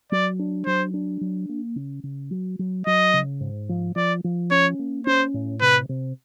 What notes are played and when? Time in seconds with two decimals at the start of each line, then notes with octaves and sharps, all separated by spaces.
0.12 F#3 D5
0.39 D4
0.66 F#3 C5
0.94 D4
1.21 F#3
1.49 A#3
1.76 C#3
2.03 C#3
2.31 F#3
2.59 F#3
2.87 F#3 D#5
3.13 C#3
3.41 G#2
3.69 F3
3.96 F3 D5
4.24 F3
4.51 C#4 C#5
4.79 A#3
5.06 C#4 C5
5.34 A2
5.61 C3 B4
5.89 C3